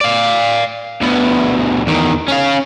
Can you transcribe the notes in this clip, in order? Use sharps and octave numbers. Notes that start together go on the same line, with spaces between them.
D5 F5
D2 B3
E2 D#3
C#4 F5